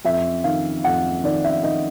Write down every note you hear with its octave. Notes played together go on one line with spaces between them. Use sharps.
F2 E5
D#3 F5
F2 F#5
D#3 D5
E5
D#3 D#5